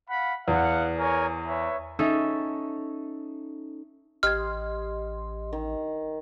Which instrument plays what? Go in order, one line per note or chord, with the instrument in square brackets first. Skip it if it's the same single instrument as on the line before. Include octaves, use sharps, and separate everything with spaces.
[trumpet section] F5 F#5 B5
[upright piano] E2 [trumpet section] F5 F#5
[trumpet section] A#4 C#5 G#5
B4 C#5 E5
[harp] C#4 D#4 A4 E5
[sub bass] A1 [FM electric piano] G4 D#5 C6 [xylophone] F6 G#6
[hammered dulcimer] D#3